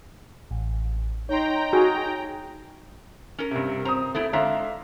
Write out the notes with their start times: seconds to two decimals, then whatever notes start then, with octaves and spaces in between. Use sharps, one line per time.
0.51 A1
1.29 D#4 C#5 G5 A#5 C6
1.73 F#4 G#4
3.38 C#4 A#4
3.51 G2 C3
3.85 C4 A#5 D#6
4.15 A3 B3 E4
4.33 D3 G#3 E5 F5 A#5